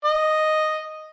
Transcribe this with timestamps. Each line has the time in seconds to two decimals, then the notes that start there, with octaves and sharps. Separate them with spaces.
0.04 D#5